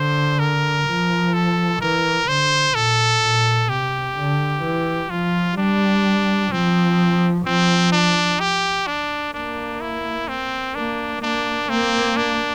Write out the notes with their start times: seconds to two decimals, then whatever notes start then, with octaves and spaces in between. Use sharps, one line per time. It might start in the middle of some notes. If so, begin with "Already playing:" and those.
Already playing: D3 C5
0.39 A#4
0.87 F3
1.34 A4
1.81 E3 A#4
2.27 D3 C5
2.75 A#2 A4
3.22 A#2
3.69 C3 G4
4.16 D3
4.63 E3
5.10 F3 F4
5.57 G3 D4
6.52 F3 C4
7.46 F3 C4
7.92 D4
8.40 G4
8.87 D4
9.34 A#3 D4
9.81 E4
10.28 C4
10.75 A#3 D4
11.22 A#3 D4
11.69 A#3 C4
12.17 D4